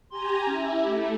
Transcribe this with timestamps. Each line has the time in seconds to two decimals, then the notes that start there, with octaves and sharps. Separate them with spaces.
0.10 G4 G#5 A#5 C6
0.47 C#4 E4
0.83 A3 G4